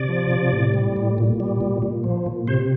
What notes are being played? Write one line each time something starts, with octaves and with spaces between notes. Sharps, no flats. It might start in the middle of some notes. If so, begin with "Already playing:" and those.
Already playing: C3 D5
F3
C3
A2
G3
A2
A#2
G3
A#2
A#2
F3
A#2
C3 C5